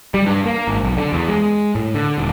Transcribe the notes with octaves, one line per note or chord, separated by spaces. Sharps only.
G3
G2
A#3
G#1
B1
D3
E2
G#3
A2
D3
D#1